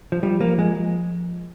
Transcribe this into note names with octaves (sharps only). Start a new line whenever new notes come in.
F3
F3 G3
F3 A#3
F3 G#3